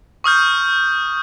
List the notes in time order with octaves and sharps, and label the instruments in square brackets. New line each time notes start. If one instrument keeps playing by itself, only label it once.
[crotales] C#6 D#6 F6 G6